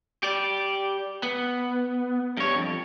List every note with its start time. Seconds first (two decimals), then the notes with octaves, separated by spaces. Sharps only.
0.23 G4 D5
1.23 B3
2.37 G2 C#5
2.56 F2